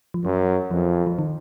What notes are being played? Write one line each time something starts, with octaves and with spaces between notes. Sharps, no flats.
F3
F#2 F#3
F2 F3
F3
D#3